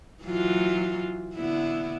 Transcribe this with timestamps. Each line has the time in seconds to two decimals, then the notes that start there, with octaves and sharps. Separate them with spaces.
0.23 E3 F#3 F4
1.35 D3 B3 E4